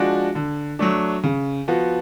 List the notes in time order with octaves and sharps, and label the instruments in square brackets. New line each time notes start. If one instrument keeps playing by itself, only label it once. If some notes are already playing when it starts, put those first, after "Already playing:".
Already playing: [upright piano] F3 G#3 D4 F#4
D3
F#3 A3 D4
C#3
F3 B3 F#4